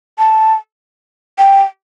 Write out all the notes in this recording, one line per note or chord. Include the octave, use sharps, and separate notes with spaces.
A5
G5